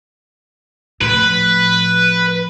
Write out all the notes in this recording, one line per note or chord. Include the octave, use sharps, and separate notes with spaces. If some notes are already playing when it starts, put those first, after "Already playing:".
A2 F3 B4